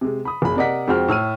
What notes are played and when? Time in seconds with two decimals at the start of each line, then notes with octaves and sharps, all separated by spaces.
0.01 C3 G#3
0.25 B5 D#6
0.42 F#1 G#4 B5
0.56 C3 A#4 D5 D#5 F#5 B6
0.87 F2 G#3 F#4 C5 G5 F6
1.08 A2 E6 F6 D#7